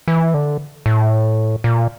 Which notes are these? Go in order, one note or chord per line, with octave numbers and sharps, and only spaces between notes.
E3
D3
A2
A#2